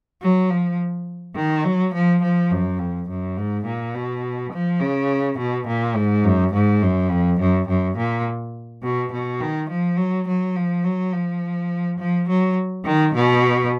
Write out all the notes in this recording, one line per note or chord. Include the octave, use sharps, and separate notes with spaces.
F#3
F3
D#3
F#3
F3
F3
F#2
F2
F#2
G#2
A#2
B2
F3
C#3
B2
A#2
G#2
F#2
G#2
F#2
F2
F#2
F#2
A#2
B2
B2
D#3
F3
F#3
F#3
F3
F#3
F3
F3
F#3
D#3
B2